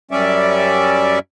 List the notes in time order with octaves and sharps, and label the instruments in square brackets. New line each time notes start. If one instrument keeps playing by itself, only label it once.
[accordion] F#2 G3 C#4 D5 E5